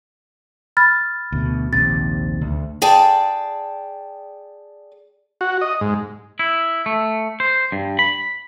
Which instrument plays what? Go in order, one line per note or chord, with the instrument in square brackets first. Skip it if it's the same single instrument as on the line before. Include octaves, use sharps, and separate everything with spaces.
[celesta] B5 F6 A6
[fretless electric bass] D2 B2
[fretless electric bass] A#1 D#2 C3 [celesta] A6
[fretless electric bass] D2
[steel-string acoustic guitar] G#4 D5 G5 A5
[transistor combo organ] F#4
D#5
G#2
[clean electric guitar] E4
A3
C5
G2
B5